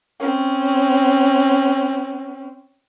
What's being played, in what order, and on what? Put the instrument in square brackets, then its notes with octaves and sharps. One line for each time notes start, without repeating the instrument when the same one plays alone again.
[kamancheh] C4 C#4